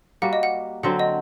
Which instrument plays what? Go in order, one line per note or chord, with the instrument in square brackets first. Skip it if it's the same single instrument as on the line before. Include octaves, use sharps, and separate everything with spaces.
[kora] G3 A#3 F#4 [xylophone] F#5
[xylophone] D#5
F#5
[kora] D3 F#3 C4 [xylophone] F#5
[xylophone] D#5